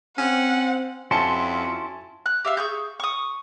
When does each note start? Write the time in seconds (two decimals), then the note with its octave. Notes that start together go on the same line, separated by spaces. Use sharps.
0.18 C4 C#4 F#5
1.11 F2 C#4 E4 F#4 G#5 A5 C6 C#7
2.26 F#6
2.45 G4 E5 F5
2.57 G#4 C#6 G6
3.00 C#6 D#6